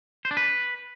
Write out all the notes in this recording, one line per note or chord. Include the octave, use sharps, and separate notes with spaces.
C5
D4
B4